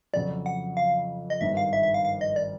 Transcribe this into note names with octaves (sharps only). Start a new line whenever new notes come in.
F2 C#3 F#3 D5
F#5
F5
D#5
G#1 G2 D#3 E5
F5
E5
E5
F5
F5
D#5
D5